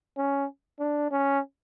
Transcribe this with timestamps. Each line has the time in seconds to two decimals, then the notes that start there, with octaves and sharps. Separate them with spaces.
0.17 C#4
0.79 D4
1.11 C#4